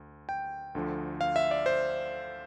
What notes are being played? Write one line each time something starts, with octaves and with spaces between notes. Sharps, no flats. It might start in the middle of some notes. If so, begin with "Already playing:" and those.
Already playing: D2
G5
D2 D3 F3
F5
E5
D5
C5